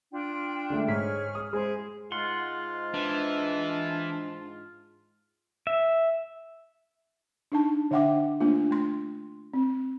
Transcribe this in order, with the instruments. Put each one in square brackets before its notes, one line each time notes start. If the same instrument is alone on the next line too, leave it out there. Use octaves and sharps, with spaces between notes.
[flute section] D4 F4 G5
[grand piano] D3 G#3 A3
[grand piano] G#2 B6 [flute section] G#4 C#5 F6
[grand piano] D#6
[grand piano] G#3 [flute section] E4 G#4 C5
[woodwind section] G#2 G#3 F4 [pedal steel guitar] F#5 C6
[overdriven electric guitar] E3 [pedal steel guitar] D4
[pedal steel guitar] E5
[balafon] D4 D#4 A5
D3 D4 E5 F#5 G5 D6
A3 A#3 D4 F4
A3 C6
C4